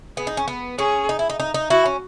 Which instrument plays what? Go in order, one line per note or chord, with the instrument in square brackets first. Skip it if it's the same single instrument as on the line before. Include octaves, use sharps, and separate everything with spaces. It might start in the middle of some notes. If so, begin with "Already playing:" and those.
[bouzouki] B3 [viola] G#4
[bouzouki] D#4
C#4
B3
[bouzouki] C#4 [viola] G#4
[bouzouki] D#4
E4
D#4
D#4
D#4
[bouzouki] E4 [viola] F#4
[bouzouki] C#4